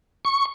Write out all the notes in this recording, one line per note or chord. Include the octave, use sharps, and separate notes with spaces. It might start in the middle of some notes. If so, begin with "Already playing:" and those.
C#6